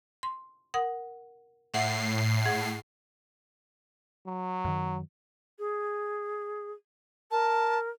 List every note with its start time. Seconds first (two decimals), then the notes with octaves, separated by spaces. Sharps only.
0.23 C6
0.74 A#4 F#5 D#6
1.74 A2 E5 F#5 C7
2.46 G#2 G#4 F#5
4.27 F#3
4.65 F#2 D#3
5.59 G#4
7.31 A#4 A5